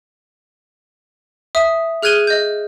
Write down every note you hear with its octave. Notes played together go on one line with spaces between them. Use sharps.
E5 D#6
G#4 F6 F#6 G#6 D#7 G7
D#5 G6